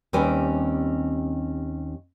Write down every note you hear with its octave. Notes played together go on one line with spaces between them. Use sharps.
D#2 G3 C4 C#4 B4 G#5